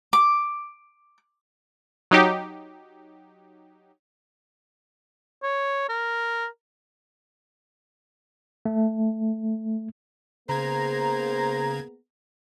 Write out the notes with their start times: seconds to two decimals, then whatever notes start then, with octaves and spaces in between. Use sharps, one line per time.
0.13 D6
2.11 F#3 D#4 G4
5.43 C#5
5.89 A#4
8.65 A3
10.49 C#3 A#3 B3 G#4 C5 A#5 G#6